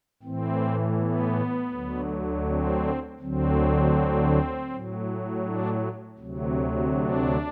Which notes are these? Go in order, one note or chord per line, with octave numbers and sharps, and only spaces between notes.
A2 E3 C4
B3
D2 D3 F#3
C4
D2 D3 F#3 C4
A2 F#3
D4
D2 C3 F#3
D4